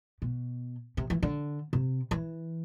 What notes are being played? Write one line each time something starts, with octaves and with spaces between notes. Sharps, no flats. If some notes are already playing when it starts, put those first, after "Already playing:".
B2
C3
E3
D3
C3
E3